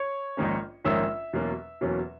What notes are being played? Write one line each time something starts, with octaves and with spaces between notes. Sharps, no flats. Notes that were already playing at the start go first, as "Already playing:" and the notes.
Already playing: C#5 C#6
A#1 G#2 D#3 A#3 C#4
A#1 G#2 D#3 A#3 C#4 E5 E6
E2 B2 F#3 A#3 C#4
E2 B2 F#3 A#3 C#4